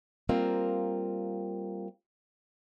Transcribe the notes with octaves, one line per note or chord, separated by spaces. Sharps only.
G3 A#3 C4 F4 A#4